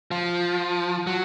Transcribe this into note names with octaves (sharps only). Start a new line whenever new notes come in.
F3
F#3